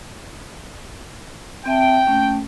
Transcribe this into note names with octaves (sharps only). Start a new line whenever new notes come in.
C4 E5 G5 A5
A3 A#3 C#4